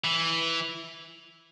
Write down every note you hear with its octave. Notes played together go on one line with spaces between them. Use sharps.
E3